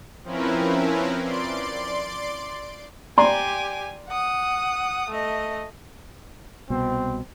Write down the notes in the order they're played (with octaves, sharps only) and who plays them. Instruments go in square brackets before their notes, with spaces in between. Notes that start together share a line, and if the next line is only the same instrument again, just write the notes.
[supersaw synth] F3 C4 C#4 E4 A#4 B4
D5 C6 D7
[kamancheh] G4 G#5 [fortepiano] D5 A#5 C6
[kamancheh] F#5 D#6
A3 D#5
[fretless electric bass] C2 B2 [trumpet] C4